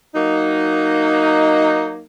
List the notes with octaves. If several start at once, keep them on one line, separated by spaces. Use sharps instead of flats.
F#3 A#3 D#4